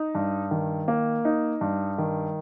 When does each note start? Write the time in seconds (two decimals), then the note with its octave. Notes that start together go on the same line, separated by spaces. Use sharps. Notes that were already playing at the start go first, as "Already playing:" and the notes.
Already playing: D#4
0.15 G2
0.51 D#3
0.88 A#3
1.25 D#4
1.61 G2
1.98 D#3